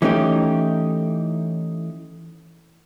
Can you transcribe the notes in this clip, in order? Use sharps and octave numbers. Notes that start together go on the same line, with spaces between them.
E3 A3 C#4 D#4 G4